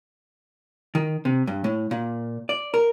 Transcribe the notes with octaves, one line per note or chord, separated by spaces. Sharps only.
D#3
C3
G2
A2
A#2
D5
A#4